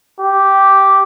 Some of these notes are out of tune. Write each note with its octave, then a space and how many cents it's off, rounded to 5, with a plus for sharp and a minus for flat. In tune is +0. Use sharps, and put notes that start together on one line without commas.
G4 -5